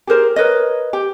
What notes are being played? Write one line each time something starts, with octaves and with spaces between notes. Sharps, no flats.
G4 G#4 A#4 C5
A#4 B4 C#5 D#5
G4